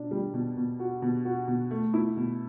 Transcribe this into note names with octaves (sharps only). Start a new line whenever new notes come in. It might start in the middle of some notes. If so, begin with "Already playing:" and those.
Already playing: B2 D4
G3
B2
B2
F#4
B2
F#4
B2
A3
E4
B2